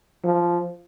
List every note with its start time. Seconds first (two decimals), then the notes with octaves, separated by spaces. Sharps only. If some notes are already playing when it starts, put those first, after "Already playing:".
0.24 F3